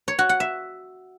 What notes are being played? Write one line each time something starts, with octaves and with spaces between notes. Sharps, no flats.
C#5
F#4
F#5
E5